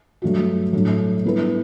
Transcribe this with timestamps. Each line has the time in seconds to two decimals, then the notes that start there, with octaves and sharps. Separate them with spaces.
0.22 G2 F#3 A3 D4 F#4
0.73 A2 F#3 A3 D4 A4
1.24 G3 B3 E4 B4